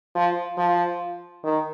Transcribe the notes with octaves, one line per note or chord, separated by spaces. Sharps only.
F3
F3
D#3